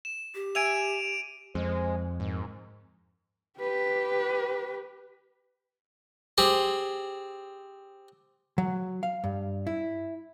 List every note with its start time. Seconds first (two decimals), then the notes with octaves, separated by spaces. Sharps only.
0.05 E7
0.35 G4
0.55 E5 G#5 D7 D#7 F7
1.55 F2 G#3 C5
2.20 G#2 D#3
3.58 G4 B4
6.38 C4 G4 G#4
8.58 F#3
9.03 F5
9.24 G2
9.67 E4